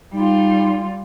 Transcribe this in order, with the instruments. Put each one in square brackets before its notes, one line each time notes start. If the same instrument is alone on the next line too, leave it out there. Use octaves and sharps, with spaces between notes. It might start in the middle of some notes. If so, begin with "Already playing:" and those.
[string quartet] G3 F4 [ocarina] D#4